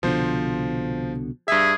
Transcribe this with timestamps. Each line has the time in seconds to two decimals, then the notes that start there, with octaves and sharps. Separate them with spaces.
0.03 C2 B2 D3 F3 C5
1.48 G2 G#4 E5